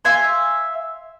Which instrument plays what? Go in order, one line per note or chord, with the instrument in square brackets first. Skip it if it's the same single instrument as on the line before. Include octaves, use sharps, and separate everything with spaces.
[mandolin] E5 F5 G#5 C6